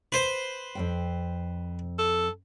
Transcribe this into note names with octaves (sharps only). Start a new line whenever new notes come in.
B4 C5
F2 G#2 G5
A4